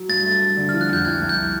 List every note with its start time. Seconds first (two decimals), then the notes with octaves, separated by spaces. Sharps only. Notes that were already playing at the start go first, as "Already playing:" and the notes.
Already playing: F#3
0.09 G2 A6
0.25 A3
0.42 G2
0.57 D3
0.69 F6
0.74 F3
0.81 F#6
0.90 F2 G6
1.05 C2 G#6
1.21 C2
1.29 G6